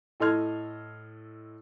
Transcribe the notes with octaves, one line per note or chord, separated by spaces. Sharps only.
A2 A4 D#5 C6 F6 G#6